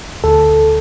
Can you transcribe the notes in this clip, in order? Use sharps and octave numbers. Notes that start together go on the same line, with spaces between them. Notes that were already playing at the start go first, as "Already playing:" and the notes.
D2 A4